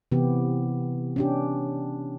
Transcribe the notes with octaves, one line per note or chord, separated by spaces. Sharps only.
C3 E3 B3 G4
C#4 D4 G4